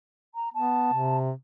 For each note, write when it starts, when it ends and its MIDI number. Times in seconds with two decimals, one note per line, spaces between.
0.35 0.49 82
0.54 0.90 59
0.54 1.17 81
0.94 1.31 48